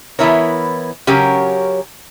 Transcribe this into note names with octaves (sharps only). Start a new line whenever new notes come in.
E3 B3 E4 A#4 C#5
C#3 F#3 C#4 G4 A#4